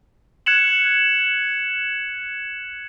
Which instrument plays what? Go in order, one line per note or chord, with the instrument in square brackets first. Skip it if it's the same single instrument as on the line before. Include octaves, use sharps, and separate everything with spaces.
[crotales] F#6 G#6 C#7 E7 F#7